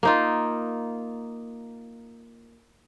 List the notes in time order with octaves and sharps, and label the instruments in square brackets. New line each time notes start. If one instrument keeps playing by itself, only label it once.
[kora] A#3 D#4 F4